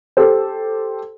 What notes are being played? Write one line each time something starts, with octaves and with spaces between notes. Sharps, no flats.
G4 A4 C5